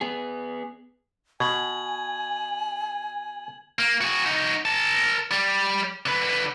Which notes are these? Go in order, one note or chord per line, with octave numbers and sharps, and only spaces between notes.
B3 G#4
B2 G#5 G#6 F#7
A#3
F#4 G#4
D#4 F#4
A#4 A5
G3
D3 B4